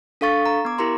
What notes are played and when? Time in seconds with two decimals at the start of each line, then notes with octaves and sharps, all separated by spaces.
0.21 D4 A4 F5 C#6 A6
0.46 A#5
0.65 B3 D6
0.78 E4 G4 A#4 A#5 C6